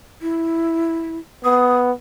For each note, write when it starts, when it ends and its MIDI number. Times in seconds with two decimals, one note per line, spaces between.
0.21 1.19 64
1.44 1.92 59
1.44 1.77 87